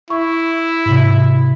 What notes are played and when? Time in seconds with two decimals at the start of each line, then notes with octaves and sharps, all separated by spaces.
0.10 E4 C#6
0.86 G#2 C3